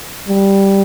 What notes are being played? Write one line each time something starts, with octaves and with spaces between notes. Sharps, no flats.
G3